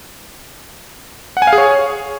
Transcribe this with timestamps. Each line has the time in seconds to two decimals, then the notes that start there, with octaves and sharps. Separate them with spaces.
1.37 F#5
1.42 G#5
1.47 F5
1.53 G#4
1.58 C#5